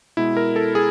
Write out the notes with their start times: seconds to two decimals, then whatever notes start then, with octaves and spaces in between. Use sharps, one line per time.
0.17 B2 G#3 E4
0.37 A#4
0.56 A4
0.75 G#4